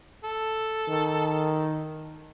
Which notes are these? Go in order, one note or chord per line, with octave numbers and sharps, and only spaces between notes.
A4
D#3